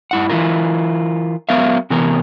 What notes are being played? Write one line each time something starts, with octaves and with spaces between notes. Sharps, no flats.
G2 E4 F#5
E3 E4 F4 A#4
F#3 B3 A#4 E5 F5
C3 E3 B3 A#4